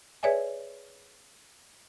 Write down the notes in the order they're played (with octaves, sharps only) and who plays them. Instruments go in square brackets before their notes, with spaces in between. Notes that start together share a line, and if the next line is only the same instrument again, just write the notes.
[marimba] G#4 B4 C#5 D5 E5 G#5